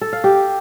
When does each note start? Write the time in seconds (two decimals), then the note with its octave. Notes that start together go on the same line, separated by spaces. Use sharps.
0.01 A4
0.13 F5
0.24 G4